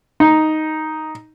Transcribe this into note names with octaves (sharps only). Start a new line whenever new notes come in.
D#4